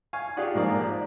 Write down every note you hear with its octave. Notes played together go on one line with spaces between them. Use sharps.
F5 G#5 C#6
F4 G4 G#4 D5 F#5 G#5
G#2 F3 A#3 D5
D5